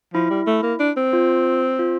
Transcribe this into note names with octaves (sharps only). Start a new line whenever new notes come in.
F3 E4
G3
A3
A#3
D4
C4
F4
F4